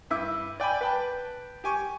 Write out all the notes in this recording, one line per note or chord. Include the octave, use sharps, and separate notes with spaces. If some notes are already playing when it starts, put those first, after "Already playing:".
G2 E4 E5 D6 E6
D5 G5 G#5 B5
B4 G5 A5
G4 G#5 C#6 D6